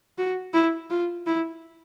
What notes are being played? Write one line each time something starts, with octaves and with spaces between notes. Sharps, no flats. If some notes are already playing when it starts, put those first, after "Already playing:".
F#4
E4
F4
E4